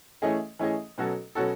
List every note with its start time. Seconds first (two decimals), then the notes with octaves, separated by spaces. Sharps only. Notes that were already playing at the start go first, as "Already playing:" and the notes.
0.22 E3 A3 C#4 G#4 D#5
0.59 E3 A3 C#4 G#4 D#5
0.98 B2 F#3 C#4 F#4 A4
1.35 B2 F#3 C#4 F#4 A4